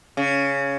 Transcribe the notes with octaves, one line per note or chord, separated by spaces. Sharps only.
C#3